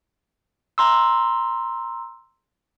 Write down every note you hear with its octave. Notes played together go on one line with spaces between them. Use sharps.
A#5 C6 E6